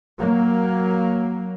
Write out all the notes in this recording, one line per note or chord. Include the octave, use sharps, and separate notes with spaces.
F#3 A#3